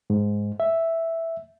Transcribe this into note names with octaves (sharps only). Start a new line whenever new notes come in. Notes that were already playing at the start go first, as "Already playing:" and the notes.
G#2
E5